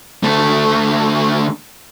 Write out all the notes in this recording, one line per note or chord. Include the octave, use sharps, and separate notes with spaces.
D2 A3